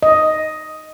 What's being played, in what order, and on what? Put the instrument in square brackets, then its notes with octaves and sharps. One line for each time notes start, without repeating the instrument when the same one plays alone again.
[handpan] D#5